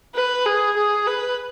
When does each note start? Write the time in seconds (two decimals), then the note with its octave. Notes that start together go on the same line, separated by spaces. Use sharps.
0.15 B4
0.46 G#4
0.77 G#4
1.07 B4